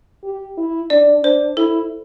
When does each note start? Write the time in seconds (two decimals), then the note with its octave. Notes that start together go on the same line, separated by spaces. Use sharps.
0.23 G4
0.57 E4
0.90 D4 D5
1.23 D4 C5
1.57 E4 A4